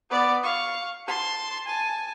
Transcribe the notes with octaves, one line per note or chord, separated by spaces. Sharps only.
B3 D5
F5 C#6
A5 C6
G#5 A5